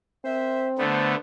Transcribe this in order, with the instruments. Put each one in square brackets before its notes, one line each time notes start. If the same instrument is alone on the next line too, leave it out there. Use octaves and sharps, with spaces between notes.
[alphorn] C4 [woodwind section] A#4 C5 E5
[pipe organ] D3 A3 B3 [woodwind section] C5